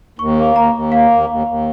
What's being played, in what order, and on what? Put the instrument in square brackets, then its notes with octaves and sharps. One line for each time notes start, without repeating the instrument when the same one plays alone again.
[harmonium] D#2 [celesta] C#6
[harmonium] A#3
[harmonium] D#2 [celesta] A#5
[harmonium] D#2
[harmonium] A#3 [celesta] F5
[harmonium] D#2
D#2
D#2